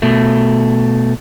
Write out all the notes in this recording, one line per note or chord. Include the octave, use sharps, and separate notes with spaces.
B2 A3